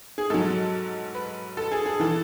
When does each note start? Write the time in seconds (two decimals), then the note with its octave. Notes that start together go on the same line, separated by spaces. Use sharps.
0.18 G#4
0.30 G#2 F#3 A4
1.15 B4
1.57 A4
1.72 G#4
1.86 G#4
2.00 E3 A4